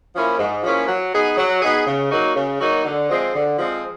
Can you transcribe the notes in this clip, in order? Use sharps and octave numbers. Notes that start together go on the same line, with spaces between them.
F3 A#3 C#4 E4
G#2
F3 A#3 C#4 E4
F#3
B3 D#4 G#4
F#3
B3 D#4 G#4
C#3
F#3 A#3 D#4 F#4
C#3
F#3 A#3 D#4 F#4
D3
F3 G#3 C4
D3
F3 G#3 C4